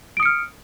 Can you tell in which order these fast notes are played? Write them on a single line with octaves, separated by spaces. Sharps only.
D7 D#6 C#7 F6